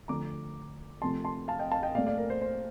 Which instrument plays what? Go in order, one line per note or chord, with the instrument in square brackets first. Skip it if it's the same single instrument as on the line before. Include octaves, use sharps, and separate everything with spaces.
[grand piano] D3 F3 A3 A#5 D6
C3 F3 A3 A5 C6
A5 C6
F5 A5
D#5 G5
F5 A5
D#5 G5
A#2 D5 F5
A3
D5 F5
A#4
C5
C5